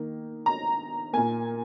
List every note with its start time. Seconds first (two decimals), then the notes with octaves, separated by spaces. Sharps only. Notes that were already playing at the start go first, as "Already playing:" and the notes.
Already playing: D#3 A#3
0.46 A#5
1.13 A#2 A#3 G#5